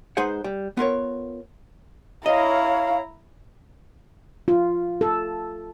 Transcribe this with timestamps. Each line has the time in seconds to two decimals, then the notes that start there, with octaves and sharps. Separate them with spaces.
0.17 G#3 D#4 G#4 B4 C5 F#5
0.44 G3
0.77 B3 F4 A#4 C#5
2.26 E4 C#5 D#5 F5 A#5
4.48 F4
5.01 A4